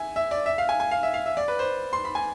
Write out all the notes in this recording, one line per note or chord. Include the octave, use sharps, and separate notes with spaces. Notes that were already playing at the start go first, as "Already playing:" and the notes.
Already playing: E5 G#5
E5
D5
E5
F5
G#5
G#5
F5
E5
F5
E5
D5
B4
C5
C6
B5
G#5